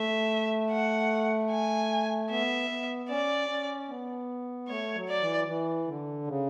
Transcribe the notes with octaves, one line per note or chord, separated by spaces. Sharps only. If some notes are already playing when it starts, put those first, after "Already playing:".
Already playing: A3 E5
F#5
G#5
B3 E5
B3
C#4 D5
C#4
B3
A3 C#5
F#3
D5
E3
E3
D3
C#3